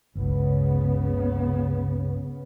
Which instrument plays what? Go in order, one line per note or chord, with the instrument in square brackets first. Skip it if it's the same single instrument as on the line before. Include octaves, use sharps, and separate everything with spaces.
[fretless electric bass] G1 C#2 [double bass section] C#3 B3